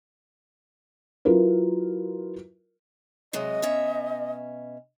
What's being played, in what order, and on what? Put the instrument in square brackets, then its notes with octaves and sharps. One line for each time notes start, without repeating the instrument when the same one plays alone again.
[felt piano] F#3 E4 F4 A#4 B4
[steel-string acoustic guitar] C3 F#3 G#3 [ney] D#5
[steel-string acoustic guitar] B2 C#4 E5